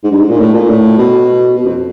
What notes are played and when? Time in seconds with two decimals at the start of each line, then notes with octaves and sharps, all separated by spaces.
0.03 G#2
0.11 G2
0.21 G#2
0.30 A#2
0.39 A2
0.54 A#2
0.69 A2
0.98 B2
1.56 B2
1.66 F2